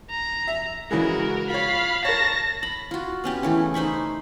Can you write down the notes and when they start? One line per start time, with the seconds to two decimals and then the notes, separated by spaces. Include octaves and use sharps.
0.10 A#5
0.48 E5
0.91 C#3 E3 G#3 F#4 A#4
1.50 F4 C#5 F5 B5
2.05 A#4 C#5 A5 A#6
2.63 B5
2.91 F4 F#4
3.24 B3 C#4 G4
3.43 C#3 E3 A3
3.74 D#4 C5 B5 C#6